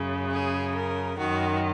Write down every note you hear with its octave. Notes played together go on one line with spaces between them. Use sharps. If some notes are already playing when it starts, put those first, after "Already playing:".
Already playing: F#2 C#3
G#4
A#4
F#2 D#3 F#4